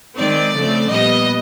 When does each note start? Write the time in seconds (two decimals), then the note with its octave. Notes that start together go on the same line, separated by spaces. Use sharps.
0.17 D#3 G#3 C4 D5
0.54 C#3 F3 A3 C4
0.90 A#2 G3 B3 D#5